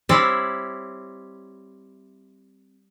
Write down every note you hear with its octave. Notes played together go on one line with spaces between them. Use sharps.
G3 C4 E4 C#5 E5